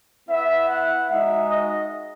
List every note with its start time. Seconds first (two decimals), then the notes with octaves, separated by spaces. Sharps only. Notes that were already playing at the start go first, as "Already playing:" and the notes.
0.28 B3 E4 E5
0.68 F#5
1.09 G#3 D#4 F#4 E5
1.49 D#5